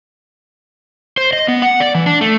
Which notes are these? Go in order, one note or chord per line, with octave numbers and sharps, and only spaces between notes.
C5
D#5
B3
F#5
D5
E3
D4
A3